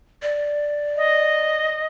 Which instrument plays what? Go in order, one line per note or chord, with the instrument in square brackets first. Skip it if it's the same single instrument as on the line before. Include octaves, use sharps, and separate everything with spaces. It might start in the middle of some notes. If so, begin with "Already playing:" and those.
[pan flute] D5
[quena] D#5